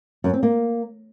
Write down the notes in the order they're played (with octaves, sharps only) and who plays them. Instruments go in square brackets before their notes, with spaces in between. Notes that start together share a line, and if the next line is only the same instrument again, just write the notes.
[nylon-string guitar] F#2
C4
A#3